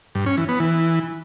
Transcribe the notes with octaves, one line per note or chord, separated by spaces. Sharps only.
G2
C#4
E3
B3
E3